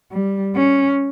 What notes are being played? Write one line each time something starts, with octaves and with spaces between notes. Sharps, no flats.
G3
C#4